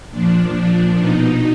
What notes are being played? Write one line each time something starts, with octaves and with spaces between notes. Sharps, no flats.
A#2 F3 D4
B2 D#4